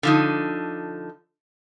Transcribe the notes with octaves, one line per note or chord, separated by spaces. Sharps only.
D3 F3 D#4